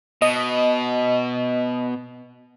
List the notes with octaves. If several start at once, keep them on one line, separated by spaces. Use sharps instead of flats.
B2 D#5